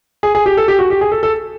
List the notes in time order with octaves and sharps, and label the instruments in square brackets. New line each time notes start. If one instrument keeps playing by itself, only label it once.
[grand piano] G#4
G#4
G4
A4
G4
F#4
G4
G#4
A4
A4